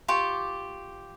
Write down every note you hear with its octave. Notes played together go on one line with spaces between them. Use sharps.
F4 G4 C#6